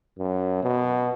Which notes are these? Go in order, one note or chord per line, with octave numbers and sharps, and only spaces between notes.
F#2
B2